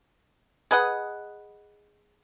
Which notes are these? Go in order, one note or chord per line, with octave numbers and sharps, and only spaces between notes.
G#4 B4 D#5 F#5